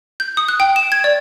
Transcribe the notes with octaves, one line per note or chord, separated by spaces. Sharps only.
G6
D#6
F#6
G5
E7
G#6
D5